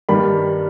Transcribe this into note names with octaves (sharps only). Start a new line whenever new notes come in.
G2 D#3 G3 B5